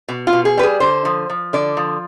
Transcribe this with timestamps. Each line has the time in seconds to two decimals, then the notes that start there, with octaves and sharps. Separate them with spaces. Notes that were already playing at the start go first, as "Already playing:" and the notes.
0.09 B2
0.27 F4
0.33 B2
0.45 G#4
0.57 G3 B4
0.63 G#4
0.80 D3 C5
1.05 F3
1.30 F3
1.53 D3 D5
1.77 F3